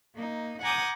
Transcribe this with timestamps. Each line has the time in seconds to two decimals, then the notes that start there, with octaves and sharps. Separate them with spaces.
0.15 A#3 D#4
0.62 F#5 G#5 A#5 D6 D#6 G6